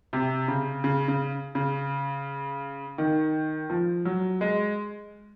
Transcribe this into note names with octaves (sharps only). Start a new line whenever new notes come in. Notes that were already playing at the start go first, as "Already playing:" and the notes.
C3
C#3
C#3
C#3
C#3
D#3
F3
F#3
G#3